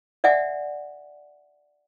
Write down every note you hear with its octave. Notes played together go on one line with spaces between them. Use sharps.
D5 E5 F#5 G#5